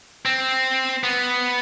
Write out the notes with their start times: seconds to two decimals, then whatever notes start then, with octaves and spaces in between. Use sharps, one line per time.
0.25 C4
1.04 B3